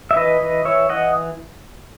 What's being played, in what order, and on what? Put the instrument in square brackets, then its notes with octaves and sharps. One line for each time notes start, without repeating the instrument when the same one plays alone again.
[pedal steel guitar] E5
E3 B4 D#5
E3
E3 C#5 E5
E3 D#5 F#5